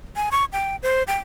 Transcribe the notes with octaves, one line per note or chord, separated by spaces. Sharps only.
G#5
C#6
G5
C5
G5